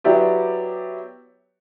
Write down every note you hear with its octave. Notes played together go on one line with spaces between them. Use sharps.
F#3 B3 E4 G4 D5